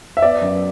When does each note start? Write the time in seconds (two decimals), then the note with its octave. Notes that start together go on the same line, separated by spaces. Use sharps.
0.17 E5
0.22 B3 D5
0.42 F#2